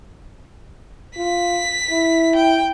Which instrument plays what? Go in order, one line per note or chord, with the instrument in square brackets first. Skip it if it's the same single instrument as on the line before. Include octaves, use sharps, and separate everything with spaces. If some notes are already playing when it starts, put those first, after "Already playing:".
[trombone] F4 [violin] B6
[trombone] E4
[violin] G5